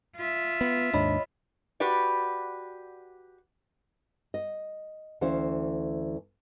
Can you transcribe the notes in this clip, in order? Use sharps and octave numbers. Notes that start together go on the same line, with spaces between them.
F4 E5
B3
D#2 G#2 D4 C#5 D#5 B5
F#4 G4 B4 D5
D#5
D2 E3 C#4 C5 F5